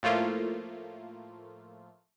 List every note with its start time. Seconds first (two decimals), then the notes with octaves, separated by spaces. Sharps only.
0.03 A2 F3 A3 A#3 F4